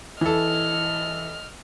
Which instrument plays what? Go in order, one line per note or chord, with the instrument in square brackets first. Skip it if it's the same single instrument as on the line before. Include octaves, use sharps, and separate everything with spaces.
[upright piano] E3 A4 [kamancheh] D#5 F6